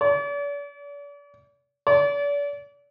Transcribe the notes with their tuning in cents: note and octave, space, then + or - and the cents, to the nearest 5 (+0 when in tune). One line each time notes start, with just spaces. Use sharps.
D5 -45
D5 -40